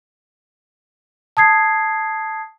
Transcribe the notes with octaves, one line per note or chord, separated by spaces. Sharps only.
A5 D#6 G#6 C7